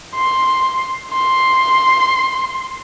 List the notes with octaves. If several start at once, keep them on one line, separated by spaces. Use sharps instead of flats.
C6
C6